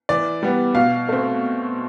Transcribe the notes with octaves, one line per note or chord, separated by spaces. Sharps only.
E3 D5
G3 B3
B2 F5
A3 C4